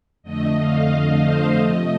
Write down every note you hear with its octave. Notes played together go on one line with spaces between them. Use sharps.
F2 D3 A3 D#5
F5
D#5
C5
C3 F3 A3 D#5